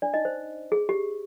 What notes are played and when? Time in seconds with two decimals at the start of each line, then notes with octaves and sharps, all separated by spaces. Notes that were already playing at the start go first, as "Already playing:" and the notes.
0.02 D4 D5
0.14 D#4 D#5
0.25 C5
0.72 G#4
0.89 G4